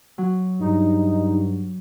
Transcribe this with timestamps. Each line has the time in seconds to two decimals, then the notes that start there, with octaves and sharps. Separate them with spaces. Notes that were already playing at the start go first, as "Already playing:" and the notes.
0.18 F#3
0.60 G2 D#4